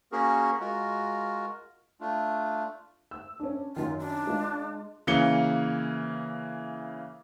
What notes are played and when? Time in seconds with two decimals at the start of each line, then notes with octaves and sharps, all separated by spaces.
0.12 A#3 C#4 F#4 G#4 A#4
0.60 G#3 F4 F#4 A#4
2.00 A3 D4 F4
3.11 E6
3.40 C#4 D4
3.76 F#2 D#3 F4
3.99 D4
4.27 G#3 F4
5.07 C#3 E3 A#3 C#7 G7